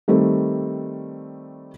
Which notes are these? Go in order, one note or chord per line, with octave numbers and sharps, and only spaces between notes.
D#3 G3 A3 C4